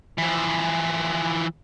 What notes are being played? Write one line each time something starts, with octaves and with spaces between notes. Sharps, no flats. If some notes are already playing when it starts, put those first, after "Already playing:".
E3 F3